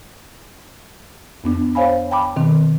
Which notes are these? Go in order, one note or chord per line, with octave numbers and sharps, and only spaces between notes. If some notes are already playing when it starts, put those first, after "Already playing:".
F2 B3 D4
C5 C#5 F5 G#5 B5
G5 A5 B5 D6
B2 D#3 C4